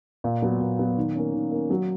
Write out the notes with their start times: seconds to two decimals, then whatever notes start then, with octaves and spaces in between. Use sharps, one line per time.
0.24 A#2
0.42 F#3 B3
0.61 A#2
0.79 F#3 B3
0.97 D#3
1.15 A#3 C#4
1.33 D#3
1.51 A#3 C#4
1.70 F#3